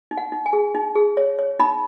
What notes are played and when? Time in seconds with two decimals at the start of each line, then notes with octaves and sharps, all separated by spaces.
0.11 D#4
0.17 F#5
0.32 D#4
0.46 G#5
0.53 G#4
0.75 D#4
0.95 G#4
1.17 C#5
1.39 C#5
1.59 D#4 B5